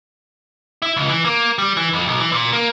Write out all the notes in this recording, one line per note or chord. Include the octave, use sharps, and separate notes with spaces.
E4
C#2
E3
A#3
G3
E3
F2
B1
E3
A#2
A#3